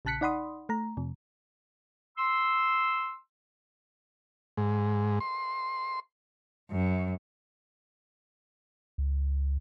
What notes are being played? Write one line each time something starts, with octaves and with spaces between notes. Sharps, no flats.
A#1 C#3 A5 F#6 B6 C#7
D#4 D5 F#5 B5 C6 D#6
A3 A#5
F2 C3 F3
C6 E6
G#2
C6
F#2
C#2